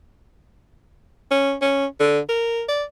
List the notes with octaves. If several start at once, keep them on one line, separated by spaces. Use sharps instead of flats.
C#4
C#4
D3
A#4
D5